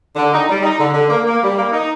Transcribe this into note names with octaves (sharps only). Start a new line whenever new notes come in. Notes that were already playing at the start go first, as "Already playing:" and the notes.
D3
D#4
G3
D#4
D3
D3
A#3
A#3
G3
A#3
D#4